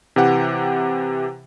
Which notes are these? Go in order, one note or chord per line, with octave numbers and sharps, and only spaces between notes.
C3 E3 G4 F#5